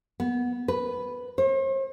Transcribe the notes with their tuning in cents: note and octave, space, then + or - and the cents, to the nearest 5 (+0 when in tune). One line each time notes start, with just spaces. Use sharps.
B3 -10
B4 +0
C5 +45